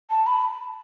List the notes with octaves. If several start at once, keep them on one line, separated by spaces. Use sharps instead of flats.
A5
B5